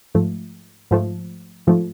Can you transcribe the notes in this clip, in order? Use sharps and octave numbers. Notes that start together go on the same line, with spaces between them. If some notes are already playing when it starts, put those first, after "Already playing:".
G#2 F3 A3
G#2 F3 A3
G#2 F3 A3